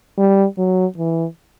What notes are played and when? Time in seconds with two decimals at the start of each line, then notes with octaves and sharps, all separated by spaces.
0.18 G3
0.58 F#3
0.98 E3